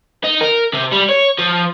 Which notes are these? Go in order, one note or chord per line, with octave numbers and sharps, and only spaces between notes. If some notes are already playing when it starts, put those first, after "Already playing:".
D#4
A#4
C3
G3
C#5
F3